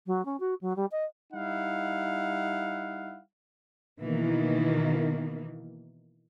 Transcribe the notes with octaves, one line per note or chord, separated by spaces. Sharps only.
F#3
C#4
F#4
F#3
G3
D#5
G3 D#4 E4 F5 F#5
B2 D#3 E3 A#3